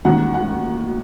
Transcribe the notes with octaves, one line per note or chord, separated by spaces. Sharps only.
E1 D#2 D#3 G3 F#5
F#5